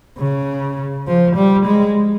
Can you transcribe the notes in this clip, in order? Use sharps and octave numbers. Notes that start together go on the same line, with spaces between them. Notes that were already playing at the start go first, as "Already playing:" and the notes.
C#3
F3
G3
G#3